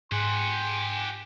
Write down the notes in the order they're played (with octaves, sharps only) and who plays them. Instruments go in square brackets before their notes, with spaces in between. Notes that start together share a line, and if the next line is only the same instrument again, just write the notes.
[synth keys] G#2 [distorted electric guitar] G4 F#5 [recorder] G#5 [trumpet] C6